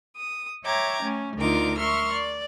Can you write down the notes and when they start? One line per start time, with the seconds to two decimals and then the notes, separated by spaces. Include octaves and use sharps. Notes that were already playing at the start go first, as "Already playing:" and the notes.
0.16 D#6
0.65 C#5 E5 G5 A#5 D6 G#6
1.03 A3 C#4
1.37 D2 D3 D#4 F4 A#4 D6
1.78 A#4 E5 C6 C#6 F6
2.12 D5